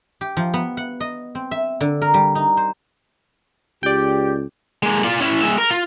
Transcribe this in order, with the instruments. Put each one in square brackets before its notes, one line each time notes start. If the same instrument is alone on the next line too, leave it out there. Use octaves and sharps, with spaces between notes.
[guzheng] G4
F3
B3
F#5
D#5
C4
E5
D3
A#4
G3
D#4
C5
[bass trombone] C#2 [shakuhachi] G4 [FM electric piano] D5 G5
[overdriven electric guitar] G#3 A#3
F4 D5
C#4 E4
G#3 E5
A#4
F4